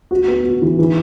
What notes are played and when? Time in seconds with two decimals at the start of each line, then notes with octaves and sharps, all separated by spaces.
0.11 F#4
0.28 B3
0.44 F#4
0.62 E3
0.79 E3